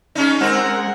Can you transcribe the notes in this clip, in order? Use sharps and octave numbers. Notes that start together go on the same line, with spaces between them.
G#3 C#4 D#4
G#3 C4 A#4 F#5